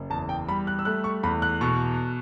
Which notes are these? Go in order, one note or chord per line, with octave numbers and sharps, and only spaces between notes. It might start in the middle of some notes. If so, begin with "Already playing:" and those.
Already playing: F#1
E2 A5
G5
G3 B5
F#6
E6
A3 F#6
C#6
E2 B5
F#6
B2 C#6